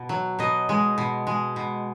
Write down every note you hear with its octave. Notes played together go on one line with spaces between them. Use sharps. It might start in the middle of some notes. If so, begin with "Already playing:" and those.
Already playing: B2
F#3
B2 D#5
G#3
B2
G#3
B2